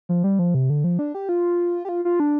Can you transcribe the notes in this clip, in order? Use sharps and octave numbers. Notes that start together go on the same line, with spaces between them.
F3
G3
F3
C3
D3
F3
D4
G4
F4
G4
F4
F4
D4